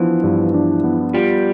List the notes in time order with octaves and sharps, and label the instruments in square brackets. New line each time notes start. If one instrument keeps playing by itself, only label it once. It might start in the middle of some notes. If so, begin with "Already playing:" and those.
Already playing: [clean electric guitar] E3 [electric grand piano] F3 B3 D4
[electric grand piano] G2
D4
B3
[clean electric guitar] G3 [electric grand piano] F4